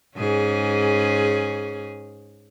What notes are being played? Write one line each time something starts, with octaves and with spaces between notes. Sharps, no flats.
G#2 C#4 G#4